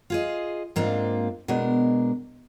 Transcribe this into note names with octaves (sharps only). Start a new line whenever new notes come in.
F4 G#4 D#5
G#2 A#3 C4 D4 F4
B2 G#3 D4 A#4